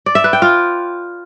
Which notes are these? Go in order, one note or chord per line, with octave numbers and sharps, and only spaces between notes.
D5
E5
B4
G5
F4